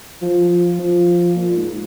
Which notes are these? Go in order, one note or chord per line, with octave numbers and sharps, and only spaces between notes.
F3
F3
A#2
G#2